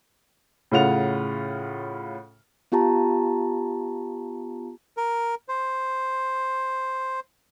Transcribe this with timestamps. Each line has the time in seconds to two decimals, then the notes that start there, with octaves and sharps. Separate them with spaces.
0.71 A2 C#3 F4 F#5 F7
2.72 B3 F4 G4 A5 A#5
4.97 A#4
5.49 C5